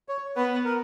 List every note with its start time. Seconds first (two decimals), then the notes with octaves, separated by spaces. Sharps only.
0.09 C#5
0.36 B3 B4
0.65 A#4